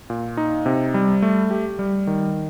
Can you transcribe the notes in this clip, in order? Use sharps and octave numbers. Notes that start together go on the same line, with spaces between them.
A#2
D#4
C3
G3
A3
G4
G3
D#3